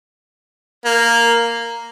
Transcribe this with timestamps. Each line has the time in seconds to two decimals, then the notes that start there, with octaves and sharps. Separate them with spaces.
0.85 A#3